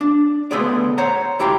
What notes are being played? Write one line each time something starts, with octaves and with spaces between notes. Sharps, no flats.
D4
D3 A3 B3 G#4 C5 D5
C5 C#5 F#5 A#5
D2 E4 G4 G5 A#5 C6